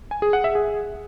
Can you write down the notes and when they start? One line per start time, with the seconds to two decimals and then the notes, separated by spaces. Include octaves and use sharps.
0.11 G#5
0.22 G#4
0.33 F#5
0.44 E5
0.55 G#4